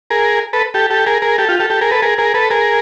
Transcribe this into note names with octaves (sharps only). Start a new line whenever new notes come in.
G#4 A#4
A4 B4
G4 A4
G4 A4
G#4 A#4
G#4 A#4
G4 A4
F4 G4
G4 A4
G4 A4
G#4 A#4
A4 B4
G#4 A#4
G#4 A#4
A4 B4
G#4 A#4